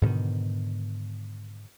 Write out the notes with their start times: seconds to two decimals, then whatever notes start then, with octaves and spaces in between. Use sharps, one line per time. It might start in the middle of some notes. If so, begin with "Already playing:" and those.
0.02 G#2 B2 D3 D#3